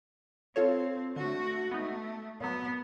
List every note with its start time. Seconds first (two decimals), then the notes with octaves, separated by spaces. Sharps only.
0.56 C4 F4 A4 C#5
1.16 D3 A3 F#4
1.71 A3 B3 D#4
2.40 A#2 F#3 B3